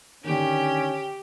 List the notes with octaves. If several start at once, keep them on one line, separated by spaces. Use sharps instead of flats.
D3 D#3 C#4 G4